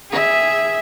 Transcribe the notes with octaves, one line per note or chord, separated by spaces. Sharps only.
G#4 E5